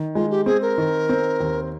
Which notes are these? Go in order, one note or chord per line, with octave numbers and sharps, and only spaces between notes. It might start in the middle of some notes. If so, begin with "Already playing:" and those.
Already playing: D#3
G#3 F4
G4
C4 G#4
A#4
D#3
C4
D#2